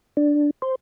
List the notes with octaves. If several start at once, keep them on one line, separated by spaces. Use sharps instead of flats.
D4
C5